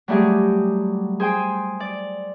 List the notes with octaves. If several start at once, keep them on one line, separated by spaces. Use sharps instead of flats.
F#3 G3 A3 G4 G#4
G#4 C5 G5 G#5
D5